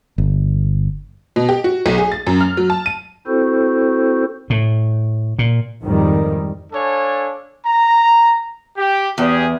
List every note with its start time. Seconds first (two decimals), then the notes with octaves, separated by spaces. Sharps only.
0.18 G1
1.36 B2
1.49 G4
1.64 F#4
1.86 B1
1.98 G#4
2.12 A6
2.27 F#2
2.41 F6
2.57 F#3
2.70 A5
2.86 D#7
3.27 C4 E4 F#4 A4 C5
4.50 A2
5.39 A#2
5.82 F2 G#2 D#3 G3
6.72 D4 A4 C#5 F5 G#5
7.66 A#5
8.78 G4
9.18 E2 G4 G#4